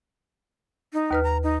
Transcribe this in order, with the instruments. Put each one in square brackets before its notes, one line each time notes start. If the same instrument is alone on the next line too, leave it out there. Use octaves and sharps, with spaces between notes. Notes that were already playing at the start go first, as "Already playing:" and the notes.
[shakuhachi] D#4
[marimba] D#2 B4 F6
[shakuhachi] A#5
D#4